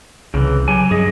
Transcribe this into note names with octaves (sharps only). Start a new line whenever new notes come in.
C2 C#3 E3
F#3 G4 G#5
G2 F#3 G#4 D#5